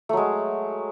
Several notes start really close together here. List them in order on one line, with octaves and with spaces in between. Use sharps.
A3 F#3 G#3